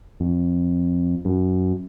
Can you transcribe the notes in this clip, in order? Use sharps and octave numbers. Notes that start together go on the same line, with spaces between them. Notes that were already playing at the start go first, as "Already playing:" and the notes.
F2
F#2